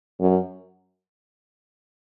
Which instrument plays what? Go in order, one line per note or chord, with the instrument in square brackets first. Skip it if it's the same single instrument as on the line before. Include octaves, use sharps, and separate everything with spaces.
[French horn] F#2